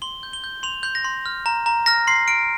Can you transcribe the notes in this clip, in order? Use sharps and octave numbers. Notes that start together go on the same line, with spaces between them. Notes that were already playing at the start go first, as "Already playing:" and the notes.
C6 G7
G6
G7
G6
C6 F7
C6 G6
A#6
C6
F6
A#5
A#5
F6 A#6
C6 C7
F6 D7